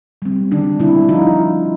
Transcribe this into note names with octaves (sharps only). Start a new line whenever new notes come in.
G3 C4
D#3 D4
G3 C4 D4 E4
F3 D#4 F4